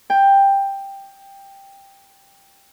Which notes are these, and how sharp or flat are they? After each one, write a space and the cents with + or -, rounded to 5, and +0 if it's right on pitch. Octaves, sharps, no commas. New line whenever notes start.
G5 +10